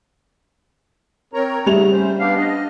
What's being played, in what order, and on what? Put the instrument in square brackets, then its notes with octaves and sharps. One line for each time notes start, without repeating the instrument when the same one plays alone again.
[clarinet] C4 [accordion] A#4 C#5 A#5
[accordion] G#2 C#3 [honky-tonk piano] G3 F7 [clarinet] A3
[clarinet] C#4 [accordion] C5
[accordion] B3 D4 G4 [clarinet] F5
[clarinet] D4 [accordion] D#5